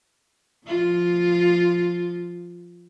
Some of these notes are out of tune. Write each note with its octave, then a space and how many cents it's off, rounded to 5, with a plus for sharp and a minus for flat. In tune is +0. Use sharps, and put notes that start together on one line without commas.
F3 +0 F4 +0